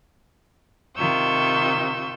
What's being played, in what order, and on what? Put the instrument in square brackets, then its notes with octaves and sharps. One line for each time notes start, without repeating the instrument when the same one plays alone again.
[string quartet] C3 D#3 F4 C#6 E6 G6